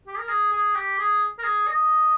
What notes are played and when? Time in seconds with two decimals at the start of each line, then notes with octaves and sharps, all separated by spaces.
0.07 G4
0.19 A#4
0.29 G#4
0.52 G#4
0.75 G4
0.99 G#4
1.39 A#4
1.44 G#4
1.68 D#5